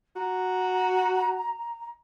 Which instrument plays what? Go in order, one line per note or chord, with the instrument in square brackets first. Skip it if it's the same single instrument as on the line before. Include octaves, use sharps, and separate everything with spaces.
[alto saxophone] F#4 [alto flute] A#5